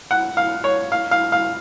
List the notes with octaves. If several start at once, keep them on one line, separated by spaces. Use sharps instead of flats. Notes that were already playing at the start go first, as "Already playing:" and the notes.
F#5
F5
C#5
F5
F5
F5